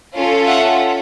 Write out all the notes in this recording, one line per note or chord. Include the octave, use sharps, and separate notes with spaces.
C#4 F4 A4
E5 F#5